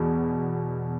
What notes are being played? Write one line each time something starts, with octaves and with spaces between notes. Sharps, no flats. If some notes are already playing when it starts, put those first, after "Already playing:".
Already playing: E2 B2